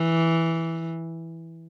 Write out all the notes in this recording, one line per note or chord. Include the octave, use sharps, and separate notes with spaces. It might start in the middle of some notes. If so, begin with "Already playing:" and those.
Already playing: E3